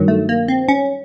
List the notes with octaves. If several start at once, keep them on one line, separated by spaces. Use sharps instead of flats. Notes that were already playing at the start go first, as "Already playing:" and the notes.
Already playing: G2 D#3 F#3
A3
A#3
C4
C#4